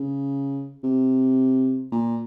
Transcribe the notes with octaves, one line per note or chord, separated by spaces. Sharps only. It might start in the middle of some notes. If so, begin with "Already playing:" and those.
Already playing: C#3
C3
A#2